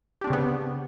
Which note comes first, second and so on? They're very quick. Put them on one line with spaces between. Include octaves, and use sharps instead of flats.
G4 D4 C4 C#3 B3